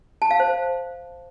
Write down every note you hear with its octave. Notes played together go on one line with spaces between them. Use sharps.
A5
F5
C5